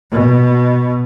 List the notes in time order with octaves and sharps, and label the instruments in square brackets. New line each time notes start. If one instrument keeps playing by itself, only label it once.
[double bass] B2